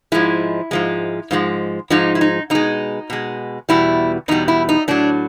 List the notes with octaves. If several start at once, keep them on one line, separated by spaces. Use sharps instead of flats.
G#2 F3 G#3 E4
G#2 F3 G#3
G#2 F3 G#3
G#2 F3 G#3 D#4
E4
D#4
B2 G#3 D#4
B2 G#3
E2 B2 G3 E4
E2 B2 G3 D#4
E4
D#4
A2 F#3 D4